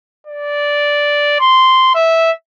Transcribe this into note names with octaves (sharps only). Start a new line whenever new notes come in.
D5
C6
E5